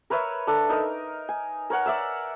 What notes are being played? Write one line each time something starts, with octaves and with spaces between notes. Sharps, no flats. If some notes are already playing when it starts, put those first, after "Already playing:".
A#4 B4 C#5 E5
D4 A4
D#4 A#4 D#6
G#5
A#4 C#5 F#5
D5 E5 E6